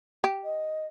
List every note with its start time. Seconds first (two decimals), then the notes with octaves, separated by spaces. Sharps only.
0.24 G4
0.43 D#5